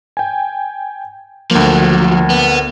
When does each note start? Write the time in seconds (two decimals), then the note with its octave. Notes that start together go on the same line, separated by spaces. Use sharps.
0.17 G5 G#5
1.51 D2 F3 F#3 A#3
2.30 B3